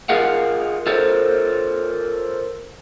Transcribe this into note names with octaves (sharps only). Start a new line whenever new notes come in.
F4 G#4 A#4 F5 F#5
F4 A4 A#4 C5 C#5